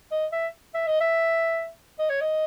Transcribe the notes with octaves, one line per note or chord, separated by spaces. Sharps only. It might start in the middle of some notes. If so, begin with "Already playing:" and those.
D#5
E5
E5
D#5
E5
D#5
C#5
D#5